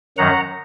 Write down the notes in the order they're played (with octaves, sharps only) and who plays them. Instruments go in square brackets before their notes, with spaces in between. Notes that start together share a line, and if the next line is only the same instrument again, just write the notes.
[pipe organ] F#2 D#3 F#3 F#5 A#5